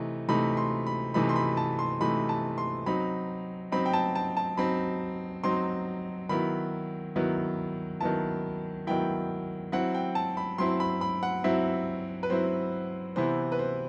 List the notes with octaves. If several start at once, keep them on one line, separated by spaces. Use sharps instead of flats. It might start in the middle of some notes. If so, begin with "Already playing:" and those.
Already playing: C3 E3 A3 D#4
C3 E3 A3 D#4 B5
C6
B5
C3 E3 A3 D#4 B5
C6
B5
A5
C6
C3 E3 A3 D#4 B5
A5
C6
F#3 C4 D#4 B5
F#3 C4 D#4 B5
G5
A5
A5
A5
F#3 C4 D#4 B5
F#3 C4 D#4 C6
D#3 F#3 B3 E4 B5
D#3 F#3 B3 E4
D#3 F#3 B3 E4 A5
D#3 F#3 B3 E4 G5
F#3 C4 E4 F#5
G5
A5
B5
F#3 C4 E4 C6
B5
B5
F#5
F#3 C4 E4 E5
B4
F#3 C4 E4 C5
C3 E3 B3 E4 C5
B4
C5